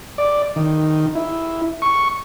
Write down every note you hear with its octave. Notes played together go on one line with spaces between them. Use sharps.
D5
D#3
E4
C#6